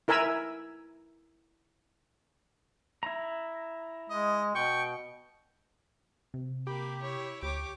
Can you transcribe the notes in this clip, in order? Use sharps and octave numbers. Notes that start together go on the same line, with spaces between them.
E4 A#4 E5 G#5 B5 E6
E4 A#5
G#3 D#5
B2 G5 C#6
C3
A#3 G4 B5
E4 C#5
D2 G4 C#5 D6